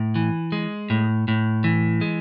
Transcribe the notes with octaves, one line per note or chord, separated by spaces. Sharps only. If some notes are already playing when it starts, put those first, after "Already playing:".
Already playing: A2
E3
G#3
A2
A2
E3
G#3